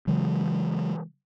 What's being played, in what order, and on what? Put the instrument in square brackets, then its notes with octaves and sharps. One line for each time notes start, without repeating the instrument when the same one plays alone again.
[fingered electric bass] C#3 E3 F#3 G#3